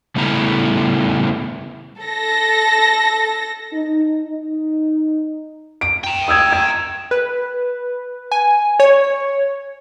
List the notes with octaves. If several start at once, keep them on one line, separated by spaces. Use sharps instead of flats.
C#3 G3 A3 B3 E4 A#5
A4 A#6
D#4
D#4
D7
G5 A#5
D#6 E6 G#6
G#6
B4
G#5
C#5